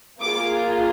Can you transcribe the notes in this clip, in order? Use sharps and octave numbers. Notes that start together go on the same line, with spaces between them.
A#3 F4 G#4 D6